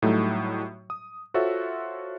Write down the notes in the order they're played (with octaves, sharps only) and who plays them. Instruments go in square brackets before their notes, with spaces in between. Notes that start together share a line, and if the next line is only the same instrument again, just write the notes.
[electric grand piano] A2 F#3 G3 A3 D#4
D#6
F4 F#4 A4 C5 C#5 E5